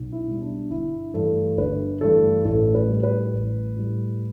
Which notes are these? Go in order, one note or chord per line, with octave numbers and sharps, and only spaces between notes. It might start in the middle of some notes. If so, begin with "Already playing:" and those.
Already playing: B1
E4
B2 G3
D4
G1 E4
G2 E3 A3 A4
G1 B4
G2 E3 A3 A4
A1 A4
B4
A2 G3
B4
A1
A2 G3